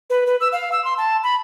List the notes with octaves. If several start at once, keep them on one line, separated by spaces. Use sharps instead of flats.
B4
B4
E6
F5
E6
C6
A5
B5